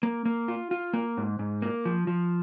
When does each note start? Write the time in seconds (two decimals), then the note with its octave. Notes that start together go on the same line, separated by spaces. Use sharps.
0.03 A#3
0.25 A#3
0.48 F4
0.71 F4
0.93 A#3
1.17 G#2
1.39 G#2
1.62 A#3
1.85 F3
2.07 F3